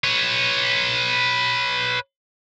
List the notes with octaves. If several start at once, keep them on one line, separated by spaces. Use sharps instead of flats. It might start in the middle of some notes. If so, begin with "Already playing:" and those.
B4 C#5